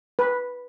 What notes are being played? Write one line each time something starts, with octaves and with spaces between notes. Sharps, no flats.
B4